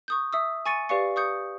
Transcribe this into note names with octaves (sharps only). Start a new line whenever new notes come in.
C#6 D#6 G6
E5 D#6 E6
G#5 C#6 A6 C#7 D#7
G4 B4 D5 F5 C#6 C#7
C#6 D#6 G6 C#7